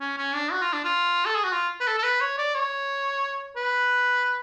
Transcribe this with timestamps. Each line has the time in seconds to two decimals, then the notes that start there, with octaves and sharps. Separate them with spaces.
0.01 C#4
0.18 C#4
0.34 D4
0.52 F#4
0.62 F4
0.73 D4
0.84 F4
1.26 A4
1.35 G#4
1.44 F#4
1.53 F4
1.81 B4
1.87 A4
1.98 A4
2.03 B4
2.21 C#5
2.38 D5
2.55 C#5
3.56 B4